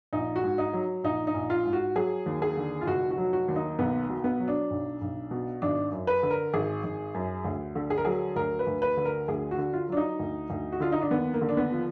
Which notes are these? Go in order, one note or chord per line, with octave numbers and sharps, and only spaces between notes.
A#1 D#4
F#4
G#2
D#4
F#3
A#1 D#4
D#4
A#1
F4
G#2
F#4
F#3 G#4
D#2
G#4
D3
F4
F1 F#4
F#4
F#3
F#4
D#2
D#4
B1 B3
B2
B3
F#3
D4
B1
B1
B2
G#1 D4
F#2
B4
D3
A#4
G#1 G#4
G#1
F#2
D2
D3
G#4
A#4
F#3 G#4
D2 A#4
B4
D2
B4
D3
A#4
D2 G#4
F#4
D3
F4
F#3 D4
D#4
D2
D2
F#4
D3 F4
D#4
D4
D#2 B3
A#3
D3
D4
B3
F3